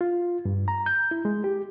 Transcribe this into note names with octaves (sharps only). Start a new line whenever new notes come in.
F4
G2
A#5
G6
E4
G#3
G4